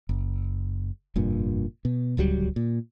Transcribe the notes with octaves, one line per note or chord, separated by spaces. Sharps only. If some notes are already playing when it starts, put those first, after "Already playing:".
F#1
F1 G2 A#2
B2
D1 C#2 F#3 G3
A#2